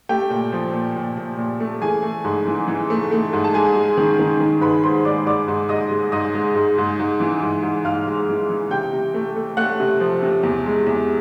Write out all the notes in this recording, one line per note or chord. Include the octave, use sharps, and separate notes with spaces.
A3 G4 G5
A#2
F3
A#2
A#2
A#2
A#2
A3
E3 G#4 G#5
A3
G#2
E3
E3
A3
A3
G#2
A5
G#3 G#4 G#5
G#3
D#3
D#3
D#3
G#2 B4 B5
G#3 C5 C6
G#2 D5 D6
G#2 D5 D6
G#2
G#2 D#5 D#6
G#3
G#2 D#5 D#6
G#3
G#2
G#2
G#2
E3
G#2
G#2
G#2 F5 F6
G#3
E3
E3
C3 G5 G6
C3
A3
A3
A3 F#5 F#6
C3
F3
C3
E2
G#3
E2